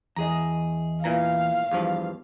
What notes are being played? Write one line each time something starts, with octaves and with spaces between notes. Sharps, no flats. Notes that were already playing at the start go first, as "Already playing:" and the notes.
E2 G#4 D#5 A#5
A#2 E3 F5 A#5
E2 G2 F3